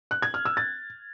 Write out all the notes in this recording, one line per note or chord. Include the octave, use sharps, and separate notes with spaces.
F#6
G#6
F6
E6
A6